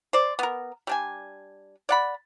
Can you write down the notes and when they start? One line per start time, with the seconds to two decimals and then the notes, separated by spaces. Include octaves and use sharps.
0.13 C5 D5
0.39 B3 A#4
0.87 G3 D4 G#5
1.89 D5 F#5 B5